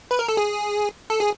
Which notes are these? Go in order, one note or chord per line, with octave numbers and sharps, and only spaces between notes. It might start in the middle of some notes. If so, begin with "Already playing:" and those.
B4
A#4
A4
G#4
A4
G#4